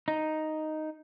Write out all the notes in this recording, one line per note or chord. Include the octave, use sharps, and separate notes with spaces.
D#4